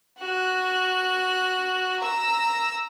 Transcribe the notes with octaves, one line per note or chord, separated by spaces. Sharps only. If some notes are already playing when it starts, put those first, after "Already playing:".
F#4 F#6
A#5 E6